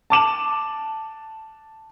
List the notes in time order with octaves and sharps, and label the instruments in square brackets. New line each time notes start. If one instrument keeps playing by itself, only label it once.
[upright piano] A5 D6 E7 F#7